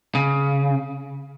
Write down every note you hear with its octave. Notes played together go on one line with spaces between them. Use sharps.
C#3